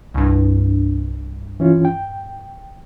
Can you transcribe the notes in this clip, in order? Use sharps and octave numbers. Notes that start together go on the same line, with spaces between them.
C2 G2
E3 C#4 F4
G5